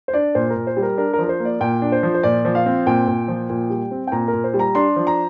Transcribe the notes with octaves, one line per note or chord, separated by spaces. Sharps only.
C5
D4 D5
A#2 C5
A#4
A#2
C5
G3
A#4
D4 A#4
A#4
F3
A#4
C5
A#3
D5
A#2 G5
D4
C5
F3
C5
A#2 D5
F3
F5
C4
A#2 G5
A#2
F3
A#2
G3
C4
G5
A#2 A#5
A#4
A#2
C5
G3
A#5
D4 C6
F3
A#5